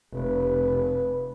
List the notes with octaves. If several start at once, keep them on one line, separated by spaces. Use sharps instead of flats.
F1 B4